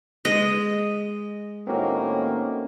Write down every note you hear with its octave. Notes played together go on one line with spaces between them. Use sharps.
G#3 D#5
A2 D#3 A#3 C4 C#4 F#4